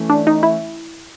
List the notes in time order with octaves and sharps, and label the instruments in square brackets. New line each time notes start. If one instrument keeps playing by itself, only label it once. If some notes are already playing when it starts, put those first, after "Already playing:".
Already playing: [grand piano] E3 A3 C#4
[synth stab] D4
D#4
E4